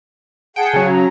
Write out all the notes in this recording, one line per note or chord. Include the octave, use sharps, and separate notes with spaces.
G#4 F#5 G5 A5
C#3 F#3
A#5